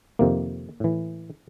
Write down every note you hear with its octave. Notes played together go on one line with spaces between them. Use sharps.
F2 C3 D#3 A#3
A2 E3